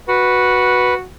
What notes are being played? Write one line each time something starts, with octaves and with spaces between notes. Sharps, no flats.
F#4 B4